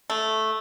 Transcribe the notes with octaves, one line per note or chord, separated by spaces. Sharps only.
A3